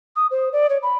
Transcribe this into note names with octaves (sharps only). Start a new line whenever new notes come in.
D#6
C5
D5
C#5
B5